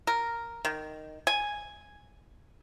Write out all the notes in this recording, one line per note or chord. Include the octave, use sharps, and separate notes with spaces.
A#4
D#3
G#5